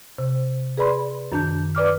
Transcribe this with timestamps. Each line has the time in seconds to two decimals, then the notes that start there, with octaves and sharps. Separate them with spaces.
0.19 C3
0.77 G#4 B4 D5 B5 C6
1.32 F#2 D#3 D4 A5 G6
1.75 B4 D5 D6 F6